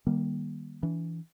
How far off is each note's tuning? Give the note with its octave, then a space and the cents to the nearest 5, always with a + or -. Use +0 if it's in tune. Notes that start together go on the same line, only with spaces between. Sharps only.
D#3 -25 G3 +0 A#3 +30
E3 +0 D4 -30